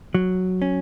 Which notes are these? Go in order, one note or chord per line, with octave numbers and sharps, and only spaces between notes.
F#3
C#4